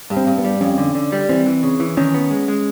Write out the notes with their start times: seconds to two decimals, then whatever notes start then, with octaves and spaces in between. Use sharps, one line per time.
0.10 G2
0.17 C4
0.27 G2
0.38 B3
0.44 G3
0.61 F2 C#4
0.78 D3
0.95 D3
1.12 G3
1.29 E3 C4
1.46 E3
1.63 C#3
1.80 E3
1.97 D#3 C#4
2.14 B3
2.31 G#3
2.48 G#3